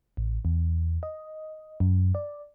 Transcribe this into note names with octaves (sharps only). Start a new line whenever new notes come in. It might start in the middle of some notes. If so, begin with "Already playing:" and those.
A1
E2
D#5
F#2
D5